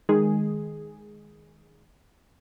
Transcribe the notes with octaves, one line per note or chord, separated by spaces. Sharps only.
D#3 G#3 G#4